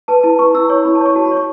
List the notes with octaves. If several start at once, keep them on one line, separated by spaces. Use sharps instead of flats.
B4 A5
E4 A5
B4 C#6
E4 E6
C#5 C#6
E4 B5
A5
C#5
C#6
F#4 A5
B5
C#5
C#6